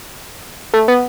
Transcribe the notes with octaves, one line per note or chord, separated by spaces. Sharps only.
A3
B3